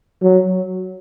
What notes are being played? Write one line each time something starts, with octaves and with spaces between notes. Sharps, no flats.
F#3